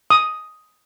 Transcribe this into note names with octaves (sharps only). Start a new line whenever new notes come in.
D#6